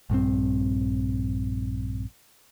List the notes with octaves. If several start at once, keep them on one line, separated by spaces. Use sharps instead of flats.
A#1 G2 C#3 C4